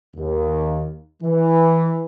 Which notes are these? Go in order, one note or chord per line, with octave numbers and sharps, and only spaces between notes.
D#2
E3